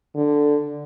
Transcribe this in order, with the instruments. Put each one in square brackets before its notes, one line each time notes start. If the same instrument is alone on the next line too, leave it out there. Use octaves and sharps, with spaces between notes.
[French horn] D3